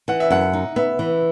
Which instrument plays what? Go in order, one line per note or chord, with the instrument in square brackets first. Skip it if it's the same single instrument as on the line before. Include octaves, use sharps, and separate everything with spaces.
[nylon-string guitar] E3 [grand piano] F#5
[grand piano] E5
[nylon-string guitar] F#2 [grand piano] F#5
[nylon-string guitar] D#4
[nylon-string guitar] B3 [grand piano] E5
[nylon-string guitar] E3